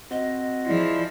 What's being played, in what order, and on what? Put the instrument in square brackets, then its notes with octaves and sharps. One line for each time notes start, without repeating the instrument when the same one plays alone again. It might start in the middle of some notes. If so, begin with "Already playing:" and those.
[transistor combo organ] C4 F#4 [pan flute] D#5
[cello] F3 [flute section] E4 G#4 D5